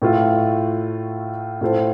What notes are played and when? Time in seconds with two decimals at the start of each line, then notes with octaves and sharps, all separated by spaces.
0.02 A2 A3 F4
1.61 A2 A3 F4 A4 C5